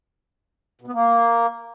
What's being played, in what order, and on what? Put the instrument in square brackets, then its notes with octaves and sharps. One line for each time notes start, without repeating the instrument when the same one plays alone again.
[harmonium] B2
B3
A#3